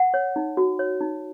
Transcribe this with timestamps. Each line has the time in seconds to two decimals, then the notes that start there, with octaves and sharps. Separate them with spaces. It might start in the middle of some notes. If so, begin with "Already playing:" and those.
Already playing: F#5
0.14 C#5
0.36 D#4
0.57 F#4
0.79 C#5
1.01 D#4